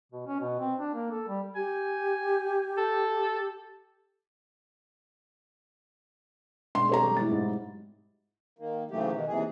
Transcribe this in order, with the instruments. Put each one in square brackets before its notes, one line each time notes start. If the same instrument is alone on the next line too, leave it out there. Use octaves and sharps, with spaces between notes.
[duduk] B2
C#4
B2
C4
D4
A#3
A4
G3
[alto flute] G4 [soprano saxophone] G#5
[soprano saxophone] A4
[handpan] B2 G#3 D4 [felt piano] C6
[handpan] C4 G4 [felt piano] A4 C#5 A#5
[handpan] F#3 G3
[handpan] G#3 A3 E4 [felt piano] A6
[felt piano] G#2
[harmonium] D#3 A#3
G#2 C#3 E3 F#3 A3 G4
B2 D#3
D#2 C3 E3 G#4